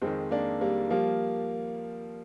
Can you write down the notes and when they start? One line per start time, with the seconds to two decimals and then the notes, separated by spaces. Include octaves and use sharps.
0.02 F2 D#3 G#3 C4
0.31 A#3 D4
0.61 G3 A#3
0.90 F3 G3 A#3